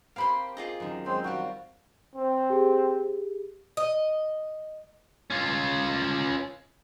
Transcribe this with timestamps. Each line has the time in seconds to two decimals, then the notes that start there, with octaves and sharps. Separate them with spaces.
0.16 A#3 C4 G4 F5 B5 C6
0.57 F4 G#4 D#5
0.80 F#2 D#3
1.06 F#3 G#3 C4 C5
1.24 G3 C4 F4 F#4
2.16 C4
2.50 G4 G#4
3.77 D#5
5.30 C#4 F4